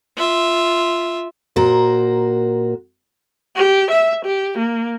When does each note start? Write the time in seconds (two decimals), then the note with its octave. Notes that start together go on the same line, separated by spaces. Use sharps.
0.16 F4 E5
1.56 A#2 F#4 A#4 C5
3.55 G4
3.91 E5
4.25 G4
4.58 A#3